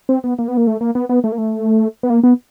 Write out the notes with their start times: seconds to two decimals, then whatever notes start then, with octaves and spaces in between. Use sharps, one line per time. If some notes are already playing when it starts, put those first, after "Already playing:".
0.09 C4
0.24 B3
0.39 A#3
0.48 B3
0.57 A#3
0.67 A3
0.81 A#3
0.95 B3
1.09 B3
1.24 A3
1.32 A#3
1.38 A3
2.03 B3
2.10 A#3
2.24 B3